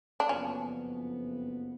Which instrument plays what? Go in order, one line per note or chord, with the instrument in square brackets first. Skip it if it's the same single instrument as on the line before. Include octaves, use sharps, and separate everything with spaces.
[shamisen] D4
[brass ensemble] F#1 F2 F3 B3 [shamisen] C#4